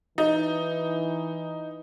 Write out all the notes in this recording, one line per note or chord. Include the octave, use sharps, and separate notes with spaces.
E3 D#4